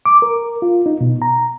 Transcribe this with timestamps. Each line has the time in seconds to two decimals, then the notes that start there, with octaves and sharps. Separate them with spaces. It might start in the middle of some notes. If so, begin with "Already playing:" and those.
0.06 D6
0.22 A#4
0.62 F4
0.86 D#4
1.01 B2
1.22 A#5